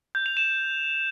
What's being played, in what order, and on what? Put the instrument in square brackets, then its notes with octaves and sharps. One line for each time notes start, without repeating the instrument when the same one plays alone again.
[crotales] G6
F7
E7